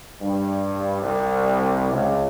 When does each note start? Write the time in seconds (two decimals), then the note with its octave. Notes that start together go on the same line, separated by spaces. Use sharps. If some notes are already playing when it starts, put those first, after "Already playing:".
0.22 G2
1.01 C2
1.93 C#2